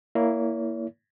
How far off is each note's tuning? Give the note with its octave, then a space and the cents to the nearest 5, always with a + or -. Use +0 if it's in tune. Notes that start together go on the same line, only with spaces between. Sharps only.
A#3 +0 E4 +0 C#5 +35